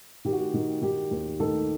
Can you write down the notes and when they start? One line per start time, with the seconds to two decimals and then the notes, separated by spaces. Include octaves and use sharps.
0.25 D#3 G4
0.33 F#4
0.40 G4
0.54 D#3
0.82 D#3 G4
1.11 D#2
1.40 D#3 A4